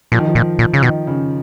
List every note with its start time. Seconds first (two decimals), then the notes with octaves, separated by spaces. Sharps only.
0.12 A#2 F3
0.19 D#3
0.27 F3
0.35 A#2
0.59 A#2
0.73 C#3
0.83 B2 D#3
1.07 C#3